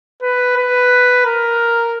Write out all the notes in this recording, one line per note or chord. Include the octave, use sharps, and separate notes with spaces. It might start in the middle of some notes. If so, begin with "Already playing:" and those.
B4
B4
A#4